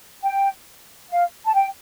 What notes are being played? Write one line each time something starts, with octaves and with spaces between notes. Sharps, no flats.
G5
F5
A5
G5